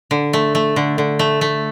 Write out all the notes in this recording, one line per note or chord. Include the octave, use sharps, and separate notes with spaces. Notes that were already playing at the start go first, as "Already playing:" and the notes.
D3
A3
A3
D3
D3
A3
A3